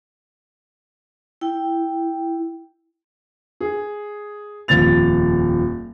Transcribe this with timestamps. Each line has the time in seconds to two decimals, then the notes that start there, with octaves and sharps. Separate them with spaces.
1.41 E4 G5
3.60 G#4
4.68 D#1 F2 A6 F7